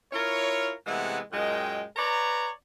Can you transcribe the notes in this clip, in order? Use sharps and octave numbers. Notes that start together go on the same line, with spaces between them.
E4 F4 A#4 C#5
C3 E3 G#3 A3 B3 F#5
F#2 A#2 G#3 D#5 G5
B4 C#5 D5 A#5